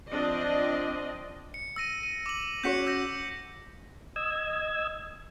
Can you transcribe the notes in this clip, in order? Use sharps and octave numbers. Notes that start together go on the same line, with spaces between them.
F3 C4 D4 D5 D#5
C#7
E6 A#6 D#7
D#7
D6 F#7
C#4 F#4 C#5 G6 B6 C#7
E6 G6 A#6
D#5 E6 G#6